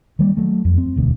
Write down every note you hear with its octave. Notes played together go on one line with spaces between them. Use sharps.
D#3 G3 G#3 A#3
F#3 A3
F2
C4
E1 D2 B2